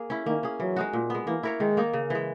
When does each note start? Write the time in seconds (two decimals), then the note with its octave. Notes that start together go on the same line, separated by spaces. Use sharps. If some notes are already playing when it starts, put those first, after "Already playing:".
Already playing: A#3 G#4
0.10 C#4 E4
0.26 D#3 A#3
0.43 C#4 G#4
0.60 E3 F#3
0.76 G#3 D#4 F#4
0.93 A#2
1.10 G#3 B3
1.26 E3 A#3
1.43 E4 A#4 C#5
1.60 D#3 G#3
1.77 A#3 D#4 A#4
1.93 C#3
2.10 E3 G#3